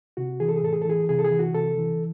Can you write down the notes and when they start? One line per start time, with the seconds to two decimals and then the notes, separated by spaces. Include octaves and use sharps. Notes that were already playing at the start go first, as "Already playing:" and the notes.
0.17 C3 F#4
0.40 E3 G#4
0.49 A4
0.56 G#4
0.63 A2 A4
0.73 G#4
0.82 A4
0.86 E3 G#4
1.09 C3 G#4
1.19 A4
1.24 G#4
1.31 E3
1.39 F#4
1.54 C3 A4
1.78 E3